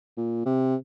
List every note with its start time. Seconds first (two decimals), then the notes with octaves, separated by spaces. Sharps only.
0.17 A#2
0.46 C3